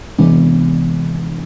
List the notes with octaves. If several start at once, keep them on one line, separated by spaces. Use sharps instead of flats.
C3 E3 G#3 B3 D4